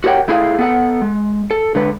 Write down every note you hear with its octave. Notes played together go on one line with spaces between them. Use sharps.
F#4 G4 A#4 C#5 F#5 G5
A3 E4 F4 G#4 E5 F5
B3 A4 F#5
G#3
A4
D3 G#3 B4